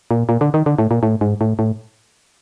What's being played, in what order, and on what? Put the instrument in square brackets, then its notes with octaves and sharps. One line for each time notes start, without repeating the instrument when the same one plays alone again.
[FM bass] A#2
A#2
D3
D#3
D3
A2
A#2
A2
G#2
A2
A2